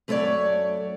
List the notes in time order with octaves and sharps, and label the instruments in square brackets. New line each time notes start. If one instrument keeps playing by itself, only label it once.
[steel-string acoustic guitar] F#2 A3 E4 A#4 C#5 D5